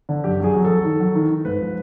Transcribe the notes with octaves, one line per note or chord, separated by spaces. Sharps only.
D3
F#2 G4
F#3 G#4
F#3
F#3 A4
D#3
F#3
D#3
D#3
G#2 B4
F3